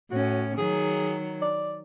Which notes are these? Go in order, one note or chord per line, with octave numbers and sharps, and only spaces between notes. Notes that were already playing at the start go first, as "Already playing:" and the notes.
A2 C#4 F#4
D#3 F#3 G#4
D5